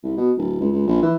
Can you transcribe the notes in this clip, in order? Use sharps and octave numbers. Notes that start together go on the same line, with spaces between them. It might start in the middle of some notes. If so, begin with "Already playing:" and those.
C2
B2
D1
C#2
C#2
A#1
E3